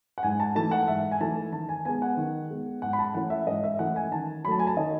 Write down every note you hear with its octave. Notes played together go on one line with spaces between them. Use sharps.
F#5
G#2 G#5
A5
E3 A3 D#4 A5
F#5
G#2 E5
G#5
E3 A3 D#4 A5
D#3 A5
G#5
G#3 B3 G#5
F#5
D#3
G#3 B3
G#2 F#5
B5
A5
E3 A3 C#4 E4 F#5
E5
G#2 D#5
E5
E3 A3 C#4 E4 F#5
G#5
D#3 A5
F#3 A3 A5 B5
G#5
A5
D#3 D#5